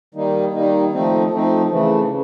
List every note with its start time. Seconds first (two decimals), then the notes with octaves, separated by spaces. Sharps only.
0.15 D#3 G3 A#3 D#4
0.53 D#3 G3 A#3 D#4
0.92 F3 A3 C4 D#4
1.31 F3 A3 C4 D#4
1.70 C#3 E3 A3
2.08 C#3